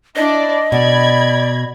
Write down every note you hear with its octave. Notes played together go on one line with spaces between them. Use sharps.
D4 E4 D5 D#5
B2 D5 B5 G#6